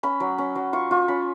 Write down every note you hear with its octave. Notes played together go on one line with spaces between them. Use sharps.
C#4 B5
F#3
C#4
F#3
F4 C#6
F4 C#6
C#4 B5